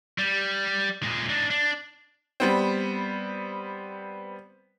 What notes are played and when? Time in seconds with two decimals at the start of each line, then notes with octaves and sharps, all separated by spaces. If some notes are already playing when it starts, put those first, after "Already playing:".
0.18 G3
1.03 A#2 G#3
1.29 D4 D#4
1.50 D4
2.40 G3 B3 C4